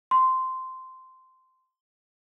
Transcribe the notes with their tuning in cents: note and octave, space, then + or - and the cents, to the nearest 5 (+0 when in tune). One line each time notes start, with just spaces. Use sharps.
C6 -10